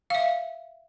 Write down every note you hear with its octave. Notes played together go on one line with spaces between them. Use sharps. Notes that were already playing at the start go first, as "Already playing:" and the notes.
E5 F5